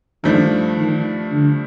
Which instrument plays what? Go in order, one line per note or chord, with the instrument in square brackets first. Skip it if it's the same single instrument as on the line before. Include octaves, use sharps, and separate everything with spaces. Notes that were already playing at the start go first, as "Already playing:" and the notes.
[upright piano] G2 F3 A3 D4 [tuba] D#3
[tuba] D#3
D3